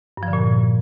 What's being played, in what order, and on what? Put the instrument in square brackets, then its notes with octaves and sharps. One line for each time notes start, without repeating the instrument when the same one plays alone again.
[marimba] G2
F3
D3
A#2
G2